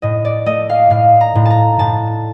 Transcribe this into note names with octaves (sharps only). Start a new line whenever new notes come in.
A2 D#5
D5
A3 D#5
F5
A2 F5
A#5
A2
A5 A#5
A2 A5